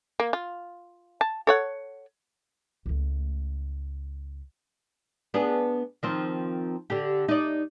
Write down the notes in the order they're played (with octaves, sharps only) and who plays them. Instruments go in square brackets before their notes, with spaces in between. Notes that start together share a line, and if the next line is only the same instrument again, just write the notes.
[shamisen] A#3
F4
A5
A4 C#5 F#5
[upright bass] C#2 A3
[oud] B3 D4 G#4
D#3 F3 C4
D3 G4
D#4 D5